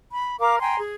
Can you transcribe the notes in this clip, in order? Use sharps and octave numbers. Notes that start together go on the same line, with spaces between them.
B5
A#4 F5 D6
G5 G#5 A#5 C6
G#4